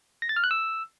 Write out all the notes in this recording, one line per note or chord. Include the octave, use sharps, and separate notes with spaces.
A#6
A6
F6
F#6
E6